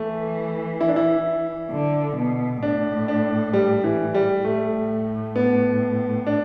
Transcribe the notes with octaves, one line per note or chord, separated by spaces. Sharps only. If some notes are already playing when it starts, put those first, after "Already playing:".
Already playing: E3 A3
E4
D4
E4
D3
B2
A2 D4
D4
G3
E3
G3
A2 A3
B3
D4